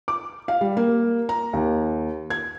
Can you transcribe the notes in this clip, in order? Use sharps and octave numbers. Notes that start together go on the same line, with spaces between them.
D6
F5
G3
A#3
A#5
D#2
G#6